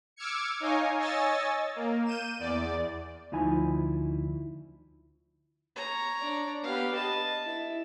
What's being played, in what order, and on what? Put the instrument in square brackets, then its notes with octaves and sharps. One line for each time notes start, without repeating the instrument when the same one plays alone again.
[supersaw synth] D6 E6 F6 G#6 C#7
D#4 C#5 D#5 F5 G#5
C#5 D#5 G#5 E6 A6
A#3
G6 D#7 E7
E2 D5
[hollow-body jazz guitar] D2 F3 D#4 E4 G#5
[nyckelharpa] C#5 A#5
[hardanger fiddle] D4 D5
[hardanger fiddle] B3 G4 [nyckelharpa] B4 F5
[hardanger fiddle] D#5 [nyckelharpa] A5
[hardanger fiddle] E4